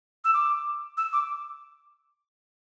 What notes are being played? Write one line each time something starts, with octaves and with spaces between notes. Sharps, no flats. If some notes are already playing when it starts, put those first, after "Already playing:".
E6
D6
E6
D6